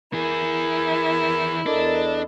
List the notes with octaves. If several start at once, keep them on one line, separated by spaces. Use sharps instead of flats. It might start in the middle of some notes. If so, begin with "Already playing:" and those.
E3 E4 G#4 A#4
E2 D4 A4 A#4 D#5